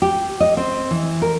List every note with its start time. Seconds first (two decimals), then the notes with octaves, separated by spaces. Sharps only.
0.02 G4
0.40 D#5
0.57 C4
0.91 E3
1.22 A#4